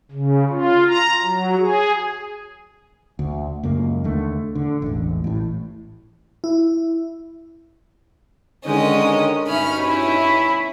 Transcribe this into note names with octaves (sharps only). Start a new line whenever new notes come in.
C#3
F4
A#5
F#3
G#4
D2
C#2 F#2 A#3
D#2 D3 A3
D3
E1 A1
A1 A2
E4
D3 D#3 G#3 C#4 D#5
G2 B2 C#4 D#4 E5 B5 F6
C#4 E4 B5